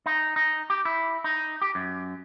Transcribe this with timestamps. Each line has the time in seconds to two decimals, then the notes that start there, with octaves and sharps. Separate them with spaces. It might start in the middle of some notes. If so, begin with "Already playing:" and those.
0.06 D#4
0.36 D#4
0.70 G4
0.85 E4
1.24 D#4
1.62 G4
1.75 F#2